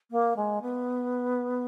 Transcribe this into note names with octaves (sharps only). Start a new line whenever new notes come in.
A#3
G#3
B3